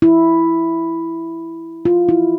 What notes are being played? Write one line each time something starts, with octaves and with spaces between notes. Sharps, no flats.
E4
F4
E4